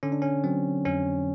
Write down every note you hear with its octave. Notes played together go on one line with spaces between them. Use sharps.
D3 C#4
D4
C#4
F#3 C4
F2 C#4